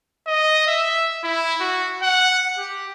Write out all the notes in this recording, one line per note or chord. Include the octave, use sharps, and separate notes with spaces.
D#5
E5
E4
F#4
F#5
G4